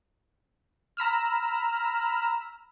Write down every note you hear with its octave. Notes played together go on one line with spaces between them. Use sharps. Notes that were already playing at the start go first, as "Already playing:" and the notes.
A#5 B5 E6 F6